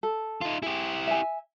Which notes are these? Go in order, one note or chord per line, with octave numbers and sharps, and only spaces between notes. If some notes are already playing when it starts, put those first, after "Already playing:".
A4
D#4 F4
E4 G4 G#4
E5 G#5